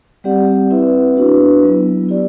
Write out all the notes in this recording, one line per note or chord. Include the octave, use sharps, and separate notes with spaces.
G3 C4 G4 D5 F#5
C4 E4 B4 E5
B3 D4 F#4 B4
F#3 B3 E4
E4 G4 D5